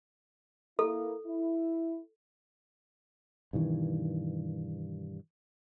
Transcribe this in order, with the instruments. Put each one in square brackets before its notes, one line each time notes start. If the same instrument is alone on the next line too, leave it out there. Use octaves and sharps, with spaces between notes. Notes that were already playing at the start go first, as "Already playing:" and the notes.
[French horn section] A#3 E4 [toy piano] A4
[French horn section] E4
[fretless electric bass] G2 B2 D#3 E3